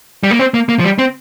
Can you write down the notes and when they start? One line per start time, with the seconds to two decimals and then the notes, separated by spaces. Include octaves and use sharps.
0.23 G3
0.31 A#3
0.39 C4
0.54 A#3
0.69 A#3
0.79 F3
0.84 G3
0.98 C4